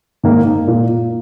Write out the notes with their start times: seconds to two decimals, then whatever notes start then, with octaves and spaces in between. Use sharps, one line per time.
0.23 G#2 D#3 A#3 D#4
0.67 A#2